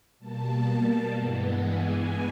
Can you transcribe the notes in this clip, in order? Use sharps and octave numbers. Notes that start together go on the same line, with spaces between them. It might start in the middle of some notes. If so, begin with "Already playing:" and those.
B2 G3 A#3 A5
G2 E3 G#3 B3
G#5